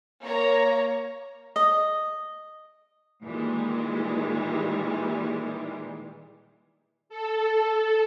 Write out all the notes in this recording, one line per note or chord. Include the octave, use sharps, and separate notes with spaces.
A#3 C#5 A#5
D#5
A#2 D#3 E3 G3 G#3
A4